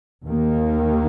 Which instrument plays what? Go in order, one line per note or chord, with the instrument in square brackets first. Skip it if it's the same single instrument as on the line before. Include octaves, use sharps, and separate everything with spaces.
[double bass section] D#2 D#3 A#3